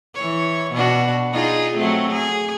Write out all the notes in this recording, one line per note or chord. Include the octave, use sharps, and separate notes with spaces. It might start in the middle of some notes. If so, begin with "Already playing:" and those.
E3 C#5
B2 D4 F#4
D#4 F4 G#4
F#3 A3 C4
G#4